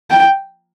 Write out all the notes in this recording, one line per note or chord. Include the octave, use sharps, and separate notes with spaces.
G5